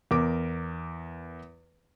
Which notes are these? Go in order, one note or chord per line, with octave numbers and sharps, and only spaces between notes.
E2 A#4 D6